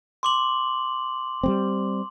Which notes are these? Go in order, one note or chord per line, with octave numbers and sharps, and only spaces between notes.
C6 D6 F#7
G3 G#3 C4